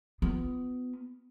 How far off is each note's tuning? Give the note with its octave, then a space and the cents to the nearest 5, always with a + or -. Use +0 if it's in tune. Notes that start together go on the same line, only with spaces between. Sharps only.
B3 +20 F4 +0